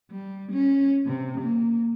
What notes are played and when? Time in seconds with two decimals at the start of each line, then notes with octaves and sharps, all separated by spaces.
0.11 G3
0.52 C#4
1.06 C3
1.40 A#3